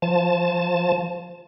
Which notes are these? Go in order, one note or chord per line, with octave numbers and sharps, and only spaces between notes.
F3 A5